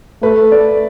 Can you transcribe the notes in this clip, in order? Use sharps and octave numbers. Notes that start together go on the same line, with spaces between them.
A3 B4
D5